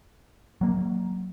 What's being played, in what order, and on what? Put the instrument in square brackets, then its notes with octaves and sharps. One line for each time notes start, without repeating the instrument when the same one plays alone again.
[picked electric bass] F#3 A#3